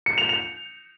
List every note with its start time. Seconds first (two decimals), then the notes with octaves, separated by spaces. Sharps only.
0.06 C#7
0.18 F7
0.29 F7